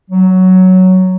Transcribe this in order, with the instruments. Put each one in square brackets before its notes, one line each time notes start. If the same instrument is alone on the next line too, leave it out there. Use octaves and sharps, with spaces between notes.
[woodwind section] F#3